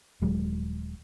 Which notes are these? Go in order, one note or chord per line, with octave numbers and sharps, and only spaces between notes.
D#1 F#3 G#3